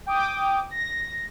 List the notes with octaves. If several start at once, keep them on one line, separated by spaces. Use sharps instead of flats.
G5 D6 D#6
A#6